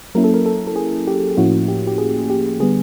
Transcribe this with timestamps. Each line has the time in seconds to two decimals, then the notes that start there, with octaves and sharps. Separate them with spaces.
0.15 F#3 A#3 C#4 E4 A#4
0.24 A4
0.34 A#4
0.46 A4
0.67 A4
0.76 G#4
1.07 G4
1.37 A2 F3 A#3 C#4 E4 F#4
1.68 G4
1.87 G4
1.98 G#4
2.30 G4
2.60 D3 G3 B3 G#4